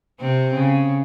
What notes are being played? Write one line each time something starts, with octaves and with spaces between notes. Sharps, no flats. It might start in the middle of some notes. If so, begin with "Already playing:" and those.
C3 C4
C#3